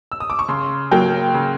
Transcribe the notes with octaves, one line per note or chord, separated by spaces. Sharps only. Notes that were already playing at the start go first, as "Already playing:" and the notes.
E6
D#6
D6
C#6
C#3 C6
F#3 A#3 G5
C#3